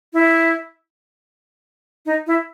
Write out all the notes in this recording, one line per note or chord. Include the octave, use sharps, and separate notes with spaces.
E4
D#4
E4